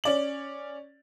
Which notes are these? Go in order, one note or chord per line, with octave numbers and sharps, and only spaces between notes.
C#4 D5 F#7